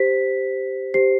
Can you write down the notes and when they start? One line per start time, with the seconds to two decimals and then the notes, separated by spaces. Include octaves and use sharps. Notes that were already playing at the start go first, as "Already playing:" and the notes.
Already playing: G4 C5 B6
0.94 G4 C5 C7